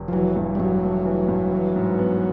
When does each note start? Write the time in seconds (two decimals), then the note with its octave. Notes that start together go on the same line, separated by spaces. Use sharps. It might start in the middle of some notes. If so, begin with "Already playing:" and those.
Already playing: F1
0.08 F3
0.12 E3 F#3
0.36 G2
0.55 G3
0.59 G2 F#3
0.82 A3
1.05 E3
1.28 G2
1.52 E3
1.76 G#2
1.98 B3